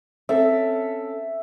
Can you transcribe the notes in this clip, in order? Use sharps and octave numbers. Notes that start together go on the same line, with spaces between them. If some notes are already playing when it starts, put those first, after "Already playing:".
C4 C#4 A4 E5